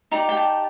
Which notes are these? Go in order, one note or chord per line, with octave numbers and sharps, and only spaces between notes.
D#4 G4 D5 A#5
G5
A5